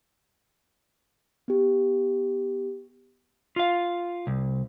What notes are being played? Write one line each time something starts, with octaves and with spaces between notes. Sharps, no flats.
B3 G4
F4 F5
C2